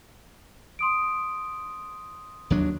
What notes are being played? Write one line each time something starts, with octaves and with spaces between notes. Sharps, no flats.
C6 D#6 D7
D#2 F#3 D4